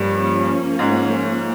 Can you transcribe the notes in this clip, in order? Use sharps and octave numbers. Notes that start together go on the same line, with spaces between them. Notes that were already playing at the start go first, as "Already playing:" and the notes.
Already playing: G2 F3 G3 A#3 C#4
G#2 G#3